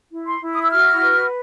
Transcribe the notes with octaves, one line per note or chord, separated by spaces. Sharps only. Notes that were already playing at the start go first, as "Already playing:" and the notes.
E4
C6
E4
D#6
E6
F#4 F6
B4